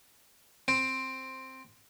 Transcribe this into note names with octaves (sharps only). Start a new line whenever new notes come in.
C4